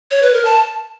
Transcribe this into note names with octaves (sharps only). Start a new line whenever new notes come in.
C#5
B4
A#4
A5